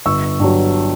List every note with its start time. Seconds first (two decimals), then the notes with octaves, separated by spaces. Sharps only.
0.06 G1 C#6 E6
0.40 G2 F#3